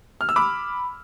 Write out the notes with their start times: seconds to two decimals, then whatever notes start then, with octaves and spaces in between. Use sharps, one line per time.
0.21 F6
0.29 E6
0.36 B5 D6